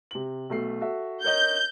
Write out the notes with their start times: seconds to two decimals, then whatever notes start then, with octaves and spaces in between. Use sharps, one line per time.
0.11 C3 F#7
0.50 B1 A3 C7
0.81 F#4 A4 E5
1.24 A#4 C#5 D#5 G6